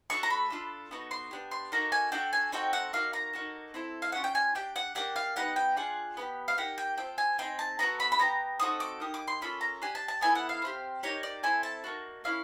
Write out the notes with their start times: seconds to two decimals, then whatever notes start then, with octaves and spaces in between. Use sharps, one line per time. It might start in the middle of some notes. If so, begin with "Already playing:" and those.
0.10 A3 D4 F#4 A4 C#6
0.23 A#5
0.30 B5
0.50 D4 F4 A4
0.91 B3 D#4 F#4 A4
1.11 C6
1.31 B3 D4 G4
1.51 C6
1.72 A#3 D#4 F#4 A4 A#5
1.92 G#5
2.12 D4 F#4 A4 G5
2.33 G#5
2.52 C4 D#4 F#4 A4 G5
2.73 F#5
2.93 A#3 D#4 F#4 F5
3.13 A#5
3.33 A#3 D#4 F#4 A4
3.74 C4 E4 A4
4.02 F5
4.12 A3 C#4 F4 F#5
4.24 G5
4.35 G#5
4.55 D4 G4 G5
4.76 F#5
4.95 A#3 D4 G4 F#5
5.16 F5
5.36 B3 D#4 G4 F#5
5.56 G5
5.76 D4 F4 G#4 F#5
6.17 B3 D#4 G4
6.48 F5
6.57 A#3 D#4 G4 F#5
6.78 G5
6.98 C4 F4 A4 G5
7.18 G#5
7.39 C4 D#4 G#4 G5
7.59 A5
7.79 B3 D4 F#4 A4 A#5
8.00 B5
8.12 B5
8.19 B3 D4 G4 A#5
8.60 C4 D#4 F#4 A4 D#6
8.80 D6
9.00 A#3 D#4 G4 D#6
9.14 D6
9.28 C6
9.41 A#3 C#4 F4 A4 B5
9.61 A#5
9.82 D4 G4 G#5
9.95 A5
10.08 A5
10.21 B3 E4 A4 G#5
10.35 F#5
10.49 F5
10.62 C4 E4 G4
11.03 A#3 D#4 G4 C#5
11.23 D5
11.43 C4 E4 A4 G#5
11.63 A5
11.84 A#3 D#4 F#4
12.24 A#3 C#4 E4 F5